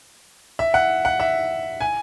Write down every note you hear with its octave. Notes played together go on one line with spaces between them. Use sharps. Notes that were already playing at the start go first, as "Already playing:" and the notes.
E5
F#5
F#5
E5
G#5